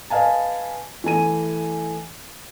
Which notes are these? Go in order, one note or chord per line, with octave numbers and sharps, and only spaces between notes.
B4 D#5 F5 G#5 A5
E3 A3 G#5 D#7